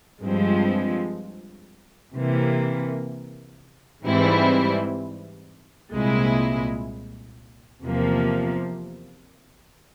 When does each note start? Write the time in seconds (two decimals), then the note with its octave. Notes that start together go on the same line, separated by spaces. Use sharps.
0.24 G2 F3 G#3 C4
2.14 C3 E3 A#3
4.03 G#2 E3 G3 C4 E4
5.93 C2 A#2 G#3 E4
7.82 E2 C3 F3 A#3